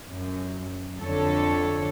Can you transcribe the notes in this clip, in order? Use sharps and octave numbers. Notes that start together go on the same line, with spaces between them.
F#2
F2 D3 A4 C#5